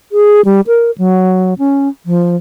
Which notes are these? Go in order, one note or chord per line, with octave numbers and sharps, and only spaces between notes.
G#4
G3
A#4
F#3
C#4
F3